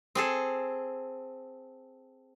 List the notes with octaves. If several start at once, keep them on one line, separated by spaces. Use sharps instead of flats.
C4 G#4 A4